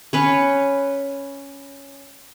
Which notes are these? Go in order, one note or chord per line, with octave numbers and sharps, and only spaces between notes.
C#4 B4 C#5